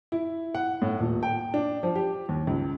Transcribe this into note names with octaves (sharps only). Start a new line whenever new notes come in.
E4
F#5
A2
D#1
G5
D4
F3
G4
D#2
C#2